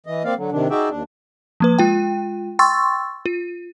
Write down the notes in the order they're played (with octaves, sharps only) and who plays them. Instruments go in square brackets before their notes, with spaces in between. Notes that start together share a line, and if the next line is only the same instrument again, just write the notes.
[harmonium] E3 D#5
A#3 C4 D5 F5
D3 F#3
C3 D#3 D4
D#4 F#4 G#4 D5 E5 G5
D#2 D4
[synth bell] F3 A#3 B4
G#3 F4 G5
G5 C6 C#6 E6 A6
F4